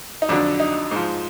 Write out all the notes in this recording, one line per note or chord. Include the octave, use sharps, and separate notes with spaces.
D#4
F2 D3 F#3 D4
D#4
G#2 F3